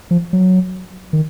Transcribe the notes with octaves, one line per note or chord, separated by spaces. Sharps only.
F3
F#3
D#3